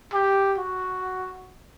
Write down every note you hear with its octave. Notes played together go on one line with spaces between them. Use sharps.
G4
F#4